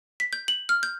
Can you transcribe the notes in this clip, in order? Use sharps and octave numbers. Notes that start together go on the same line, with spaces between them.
B6
G6
F#7
F6
G6